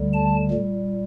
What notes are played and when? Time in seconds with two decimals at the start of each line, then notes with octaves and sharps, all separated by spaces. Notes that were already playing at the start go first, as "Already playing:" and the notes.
Already playing: D2 D3 G3
0.13 A5
0.51 A#2 G3